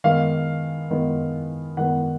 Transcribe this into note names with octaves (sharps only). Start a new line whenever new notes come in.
D#3 G#3 B3 F5
D#3 G#3 B3
D#3 G#3 B3 F#5